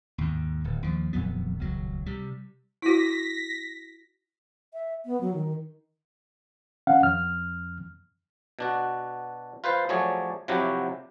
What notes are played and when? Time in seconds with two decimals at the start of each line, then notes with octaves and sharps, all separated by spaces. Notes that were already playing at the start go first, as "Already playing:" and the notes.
0.18 D#2 G#2
0.64 D1
0.83 D#2 F3
1.13 D#1 F2 F#3 B3
1.60 D#1 C#2 F#3
2.06 C3 G3
2.82 E4 F#4 A#6 B6
4.74 E5
5.05 B3
5.21 F#3
5.34 D#3
6.87 C#4 F5 F#5
7.03 F2 F6
8.59 B2 D4 F#4
9.64 F4 B4 C5 F5
9.89 F3 F#3 A3 G#4 C#5 D5
10.48 C3 F3 F#3 E4 F#4 G4